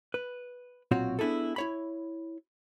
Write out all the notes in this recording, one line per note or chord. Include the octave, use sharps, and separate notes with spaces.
B4
B1 A#2 C4 F4 F#4 C#5
B3 D4 E4 G#4 A4
E4 C#5 B5